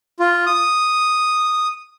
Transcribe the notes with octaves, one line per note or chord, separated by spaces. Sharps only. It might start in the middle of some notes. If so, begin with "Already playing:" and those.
F4
D#6